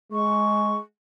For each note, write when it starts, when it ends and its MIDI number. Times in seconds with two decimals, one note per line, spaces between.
0.12 0.76 56
0.12 0.76 85